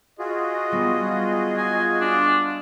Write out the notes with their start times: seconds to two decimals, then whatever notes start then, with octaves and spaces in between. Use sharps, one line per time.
0.19 F4 F#4 G#4 D#5
0.72 G3 B3
1.57 G#5
2.01 D4